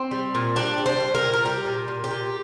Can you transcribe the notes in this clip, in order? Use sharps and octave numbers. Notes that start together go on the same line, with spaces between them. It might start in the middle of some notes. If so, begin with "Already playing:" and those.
Already playing: C4
G3
A#2
G3 D4
G3
C5
G3
A#4
A#2
A#4
G3 G4
A#2
A#2
G4
A#2